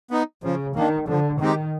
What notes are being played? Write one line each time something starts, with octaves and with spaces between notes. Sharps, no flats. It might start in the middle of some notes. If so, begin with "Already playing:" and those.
B3 D#4
C#3 F3
D#3 A#3 D4
D3 F3
D#3 G#3 C4 D#4 G4